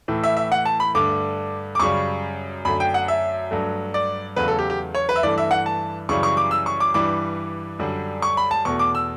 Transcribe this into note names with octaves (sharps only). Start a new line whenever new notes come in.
A2 E3 A3
E5
E5
F#5
A5
B5
G2 D3 A3 D6
D6
F#2 C#3 G3 C#6
F#2 D3 A3 B5
G5
F#5
E5
G2 F#3 A3
D5
E2 C#3 F#3 A3 B4
A4
G4
G4
C#5
B4
E5
G2 E3 A3 D5
E5
F#5
A5
F#2 C#3 E3 G3 C#6
C#6
D6
E6
C#6
D6
G2 E3 G3 D6
F#2 D3 G3
C#6
B5
A5
E2 B2 A3 C#6
D6
E6